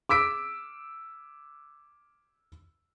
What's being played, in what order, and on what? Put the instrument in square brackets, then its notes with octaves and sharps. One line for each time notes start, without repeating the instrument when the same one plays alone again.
[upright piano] D6 E6 B6 D7